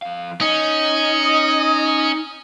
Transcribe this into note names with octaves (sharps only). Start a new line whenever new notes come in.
F2 F5
C#4 D#4 D#5